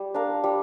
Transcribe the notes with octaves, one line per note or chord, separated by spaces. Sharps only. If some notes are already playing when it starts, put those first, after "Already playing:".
Already playing: G3
D4 A#4 F5
G3